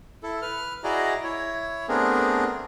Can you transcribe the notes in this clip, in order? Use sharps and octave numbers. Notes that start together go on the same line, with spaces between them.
E4 A4
B4 F6
E4 F#4 G#4 D5 D#5 A#5
E4 C#5
A3 B3 C4 D4 G#4 A#4